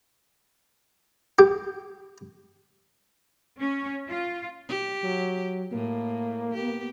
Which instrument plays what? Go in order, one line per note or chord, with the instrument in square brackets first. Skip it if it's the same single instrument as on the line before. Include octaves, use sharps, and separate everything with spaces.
[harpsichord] G4
[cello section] C#4
F4
[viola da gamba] G4
[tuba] F#3
[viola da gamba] A2 [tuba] A#3
[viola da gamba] B3 G4